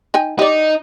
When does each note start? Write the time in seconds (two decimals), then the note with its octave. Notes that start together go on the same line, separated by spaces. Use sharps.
0.14 D#4 G5 G#5
0.39 D#4 G4 D5